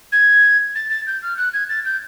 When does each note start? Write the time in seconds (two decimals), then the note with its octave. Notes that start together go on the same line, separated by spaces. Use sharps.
0.12 G#6
0.75 A6
0.90 A6
1.07 G6
1.22 F6
1.37 F#6
1.53 G#6
1.69 A6
1.85 G6